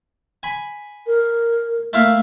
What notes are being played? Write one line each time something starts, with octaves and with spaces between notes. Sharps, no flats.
G#5 B5
A#4
A3 A#3 E4 F5